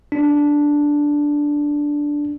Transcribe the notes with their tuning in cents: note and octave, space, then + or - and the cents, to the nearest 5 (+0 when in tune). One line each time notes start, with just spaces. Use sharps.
D4 -5